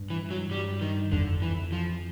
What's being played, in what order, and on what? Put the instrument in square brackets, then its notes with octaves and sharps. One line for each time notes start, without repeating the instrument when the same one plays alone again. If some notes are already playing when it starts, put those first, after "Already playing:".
Already playing: [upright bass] G2
[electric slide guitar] E3
F#3
G3
D#3
[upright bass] F2 [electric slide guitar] D3
[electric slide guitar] E3
F3